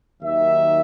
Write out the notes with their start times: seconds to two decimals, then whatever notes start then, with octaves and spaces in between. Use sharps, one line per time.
0.22 D#2 D#3 F#3 E5